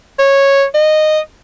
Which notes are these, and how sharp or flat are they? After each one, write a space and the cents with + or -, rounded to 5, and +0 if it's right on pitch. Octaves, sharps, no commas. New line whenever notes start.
C#5 -10
D#5 -15